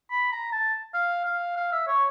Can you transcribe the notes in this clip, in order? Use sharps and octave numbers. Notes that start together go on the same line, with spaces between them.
B5
A#5
A5
F5
F5
F5
E5
C#5